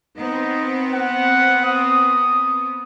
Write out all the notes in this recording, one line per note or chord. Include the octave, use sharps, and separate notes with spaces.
B3 C4 D#4
F#5
D#6